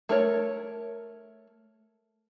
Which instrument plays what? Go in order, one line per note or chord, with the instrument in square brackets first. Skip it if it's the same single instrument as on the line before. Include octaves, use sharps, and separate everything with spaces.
[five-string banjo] A3 A#4 C#5